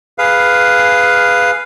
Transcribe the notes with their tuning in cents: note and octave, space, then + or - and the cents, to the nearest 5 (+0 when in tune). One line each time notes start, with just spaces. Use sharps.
G#4 +0 B4 +5 F5 +0